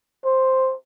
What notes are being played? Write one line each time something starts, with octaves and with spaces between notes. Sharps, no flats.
C5